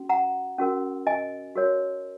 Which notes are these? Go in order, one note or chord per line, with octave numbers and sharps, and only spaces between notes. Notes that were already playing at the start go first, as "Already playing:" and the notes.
Already playing: C#4 F#4
F#5 A#5
C#4 F#4 A#4
D#5 G#5
F#4 A#4 C#5